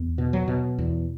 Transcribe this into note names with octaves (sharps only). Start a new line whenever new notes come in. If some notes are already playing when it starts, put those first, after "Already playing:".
Already playing: E2
B2
F#3
B2
E2